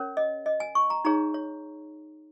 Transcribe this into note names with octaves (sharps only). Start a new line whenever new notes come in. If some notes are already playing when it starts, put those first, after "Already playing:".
Already playing: C#4 A#4 C#5
D#5
D#5
G#5
C#6
A#5
D#4 G#4 C#5 A#5
C#5